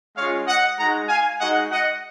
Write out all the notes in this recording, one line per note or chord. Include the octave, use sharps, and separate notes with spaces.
G#3 C#4 F4 C#5 F5
D#5 F#5
G#3 D#4 F#4 F#5 A#5
F5 G#5
G#3 D#4 F#4 D#5 F#5
D#5 F#5